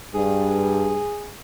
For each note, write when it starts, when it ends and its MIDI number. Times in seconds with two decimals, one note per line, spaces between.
0.14 1.01 43
0.14 1.34 68